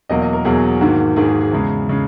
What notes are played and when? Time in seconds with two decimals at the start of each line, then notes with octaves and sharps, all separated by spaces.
0.09 E2 B2 F#3 A#3 D#5
0.22 D#5
0.33 A#4
0.45 E2 B2 F#3 A#3 G#4
0.81 G#2 D#3 A#3 F#4
1.16 G#2 D#3 A#3 G#4
1.28 G#4
1.41 G#4
1.52 E2 C#3 G#3
1.89 C#3 G#3